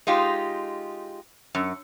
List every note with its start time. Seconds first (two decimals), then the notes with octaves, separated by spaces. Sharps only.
0.07 G#3 D#4 F4 G4
1.55 F#2